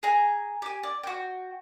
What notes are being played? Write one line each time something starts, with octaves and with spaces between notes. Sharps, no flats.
G#4 G#5 A#5
G4 G#5
D5
F#4 G5